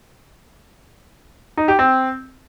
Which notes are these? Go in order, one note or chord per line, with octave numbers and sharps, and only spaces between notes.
D#4
G4
C4